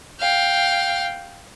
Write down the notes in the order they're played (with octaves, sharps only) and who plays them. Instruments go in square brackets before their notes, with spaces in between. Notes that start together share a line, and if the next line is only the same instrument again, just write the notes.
[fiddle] F5 G5